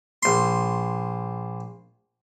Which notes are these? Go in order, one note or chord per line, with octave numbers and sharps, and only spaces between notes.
A#1 C6